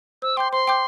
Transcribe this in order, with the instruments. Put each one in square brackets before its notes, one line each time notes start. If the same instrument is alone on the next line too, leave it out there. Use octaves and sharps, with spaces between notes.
[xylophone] C5 [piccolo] E6
[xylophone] G5 D6 G6 [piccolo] C6
[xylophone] C5 [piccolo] C6
[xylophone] G5 D6 G6